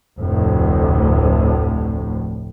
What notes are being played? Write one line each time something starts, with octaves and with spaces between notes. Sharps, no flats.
F1 D2 A2